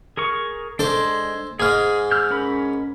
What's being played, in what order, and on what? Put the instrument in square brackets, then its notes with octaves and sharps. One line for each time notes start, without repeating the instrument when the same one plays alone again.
[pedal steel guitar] G#4 A#4 C#6
[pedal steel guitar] G#3 D4 [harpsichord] A4 C5
[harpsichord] G#2 G#3 [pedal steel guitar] G#4 F6
[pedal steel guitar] E6 F6 G6
C#4 A#4 B5